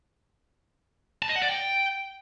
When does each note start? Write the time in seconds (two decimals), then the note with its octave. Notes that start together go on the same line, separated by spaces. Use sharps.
1.22 A5
1.29 D#5
1.36 F#5
1.42 D5
1.49 G5